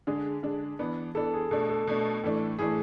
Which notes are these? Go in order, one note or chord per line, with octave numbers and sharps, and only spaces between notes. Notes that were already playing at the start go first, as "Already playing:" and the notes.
D3 G#3 D4 G#4
D3 G#3 D4
E3 B3 D4
E3 B3 D4 A4
G#4
B2 A3 D4 A4
A4
B2 A3 D4
A2 E3 A3 D4
A2 E3 A3 D4 G#4